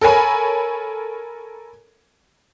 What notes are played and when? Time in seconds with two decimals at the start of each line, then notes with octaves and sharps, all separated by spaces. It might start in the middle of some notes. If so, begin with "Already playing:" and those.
0.01 A4 A#4 C#5 G#5 B5